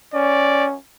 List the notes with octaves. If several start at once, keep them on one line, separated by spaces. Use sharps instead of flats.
C#4 D5